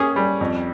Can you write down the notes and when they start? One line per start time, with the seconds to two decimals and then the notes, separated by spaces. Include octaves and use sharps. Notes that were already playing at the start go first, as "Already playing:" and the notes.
Already playing: A#3 C#4 G4 G#4
0.16 G3
0.41 F2